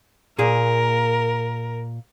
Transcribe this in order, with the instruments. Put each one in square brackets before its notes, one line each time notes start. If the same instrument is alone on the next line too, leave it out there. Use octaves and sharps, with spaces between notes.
[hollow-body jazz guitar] A#2 A#3 G#4 [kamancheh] A#4